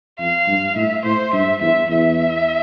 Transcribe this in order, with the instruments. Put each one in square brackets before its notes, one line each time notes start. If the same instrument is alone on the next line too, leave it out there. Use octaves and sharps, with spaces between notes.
[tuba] F2 [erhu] F5
[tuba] G2
[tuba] A2 [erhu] E5
[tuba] A2 [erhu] C5
[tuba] G2 [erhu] E5
[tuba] E2 [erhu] E5
[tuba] E2 [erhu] E5